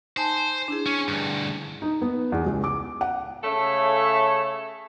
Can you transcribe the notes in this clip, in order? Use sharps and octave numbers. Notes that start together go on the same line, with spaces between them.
D#4 C5 G#5 A5
D4 E4 G#4
C#4
D2 G2
D#4
B3
E2
C#2
D6
F#5
C#3 A3 A4 C#5 E5